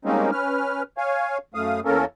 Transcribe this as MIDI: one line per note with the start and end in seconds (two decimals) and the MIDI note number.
0.05 0.31 55
0.05 0.31 56
0.05 0.31 58
0.05 0.31 60
0.05 0.31 61
0.05 0.31 63
0.32 0.83 61
0.32 0.83 71
0.32 0.83 89
0.98 1.38 73
0.98 1.38 77
0.98 1.38 80
1.54 1.80 42
1.54 1.80 57
1.54 1.80 77
1.54 1.80 87
1.85 2.05 40
1.85 2.05 58
1.85 2.05 61
1.85 2.05 69
1.85 2.05 70